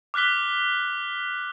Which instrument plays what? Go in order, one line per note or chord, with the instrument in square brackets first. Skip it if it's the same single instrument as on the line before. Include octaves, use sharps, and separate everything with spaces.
[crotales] D6 F6 F#6 B6 G7